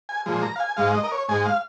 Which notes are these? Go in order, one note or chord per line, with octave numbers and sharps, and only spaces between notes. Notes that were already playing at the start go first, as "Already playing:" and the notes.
G#5
A#2 F3 G#3
A#5
F5
G#5
G#2 G#3 F5
D#5
A#4
C#5
G#2 G#3 G#5
F5